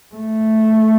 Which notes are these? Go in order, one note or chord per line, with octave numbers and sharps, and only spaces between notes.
A3